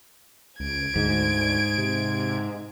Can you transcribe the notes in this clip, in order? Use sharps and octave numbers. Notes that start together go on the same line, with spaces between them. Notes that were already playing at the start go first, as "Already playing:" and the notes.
C#2 G#6 D7
D2 G#2
C3